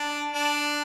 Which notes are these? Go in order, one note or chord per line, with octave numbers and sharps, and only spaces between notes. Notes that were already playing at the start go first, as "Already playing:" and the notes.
Already playing: D4
D4